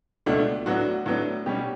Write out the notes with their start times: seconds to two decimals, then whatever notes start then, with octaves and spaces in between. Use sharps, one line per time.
0.26 C#2 B2 A3 D4
0.66 A2 F#3 B3 D4 F#4
1.06 A2 F#3 B3 D4
1.46 B2 G3 C#4 G4